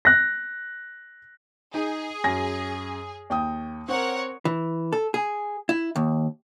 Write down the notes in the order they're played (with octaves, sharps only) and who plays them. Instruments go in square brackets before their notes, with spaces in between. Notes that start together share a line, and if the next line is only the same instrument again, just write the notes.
[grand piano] F#6 A#6
[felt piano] D#4 [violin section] G#4
[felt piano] F#2 G#5 A#6
D#2 G5 D#6
[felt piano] C4 [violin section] A#4 C#5 F#5
[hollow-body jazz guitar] E3
A4
G#4
E4
D#2